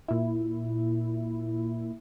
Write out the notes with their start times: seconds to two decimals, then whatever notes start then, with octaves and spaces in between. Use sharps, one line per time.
0.08 A#2 E4